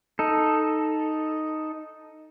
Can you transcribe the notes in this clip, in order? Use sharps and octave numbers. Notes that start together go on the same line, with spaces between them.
D#4 A4